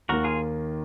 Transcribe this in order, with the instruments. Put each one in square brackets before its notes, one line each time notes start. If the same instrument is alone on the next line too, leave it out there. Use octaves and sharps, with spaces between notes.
[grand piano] D#2 D#3 A#3 [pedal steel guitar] F#4 A#4
[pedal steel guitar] F4 G#4